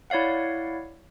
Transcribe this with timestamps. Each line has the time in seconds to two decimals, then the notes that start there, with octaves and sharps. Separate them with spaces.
0.10 E4 C#5 D5 F5 F#5